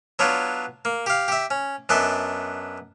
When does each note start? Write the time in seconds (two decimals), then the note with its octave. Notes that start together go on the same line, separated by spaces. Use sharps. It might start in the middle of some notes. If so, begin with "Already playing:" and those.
0.19 F#3 B3 D4 F4 C#5
0.85 A#3
1.06 G4 F5
1.28 G4 E5
1.51 C#4
1.89 F#2 B3 D4 D#5 E5